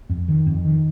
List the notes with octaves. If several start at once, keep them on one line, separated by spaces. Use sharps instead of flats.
F2
D#3
F2
D#3